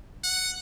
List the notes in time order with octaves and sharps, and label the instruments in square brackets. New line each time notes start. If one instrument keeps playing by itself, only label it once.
[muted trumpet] F#5